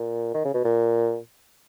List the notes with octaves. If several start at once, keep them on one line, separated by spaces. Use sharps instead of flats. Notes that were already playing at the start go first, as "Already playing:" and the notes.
Already playing: A#2
D#3
C#3
B2
A#2